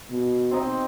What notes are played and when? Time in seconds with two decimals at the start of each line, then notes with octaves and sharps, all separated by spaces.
0.11 B2
0.51 C4 D#4 D#5